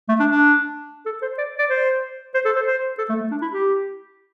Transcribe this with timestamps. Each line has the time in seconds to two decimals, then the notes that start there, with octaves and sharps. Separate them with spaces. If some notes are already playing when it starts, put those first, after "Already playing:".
0.09 A3
0.20 D4
0.30 D4
1.06 A4
1.22 C5
1.38 D5
1.59 D5
1.70 C5
2.34 C5
2.45 A4
2.56 C5
2.67 C5
2.98 A4
3.09 A3
3.21 A3
3.31 D4
3.42 E4
3.52 G4